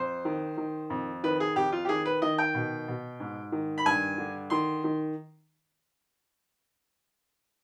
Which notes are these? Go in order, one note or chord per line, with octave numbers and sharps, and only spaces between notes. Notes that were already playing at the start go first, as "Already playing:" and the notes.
Already playing: F2 C5
D#3
D#3
F2
D#3 B4
G#4
F2 G4
F4
G4
D#3 G#4
B4
D#3 D#5
G5
B2
B2
G#2
D#3
B5
G2 G#5
D3
D#3 C6
D#3